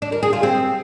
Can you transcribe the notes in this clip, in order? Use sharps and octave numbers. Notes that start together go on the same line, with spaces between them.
D4
A#4
G#4
F4
C4